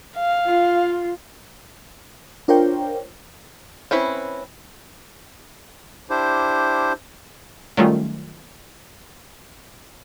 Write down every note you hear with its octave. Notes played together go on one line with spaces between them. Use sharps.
F5
F4
D4 F4 A#4 C5 C#5 G5
C4 C#4 E4 B4
D4 E4 G4 C5
D#3 F#3 G3 A3 C#4 F4